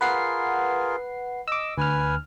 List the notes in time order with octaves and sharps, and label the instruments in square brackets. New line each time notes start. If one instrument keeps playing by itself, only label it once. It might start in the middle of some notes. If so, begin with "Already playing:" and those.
[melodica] F4 G#4 A#4 [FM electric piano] B4 F#5 C7
[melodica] D#5 [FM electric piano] D6 E6
[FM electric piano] D2 F6 [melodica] B4 G#5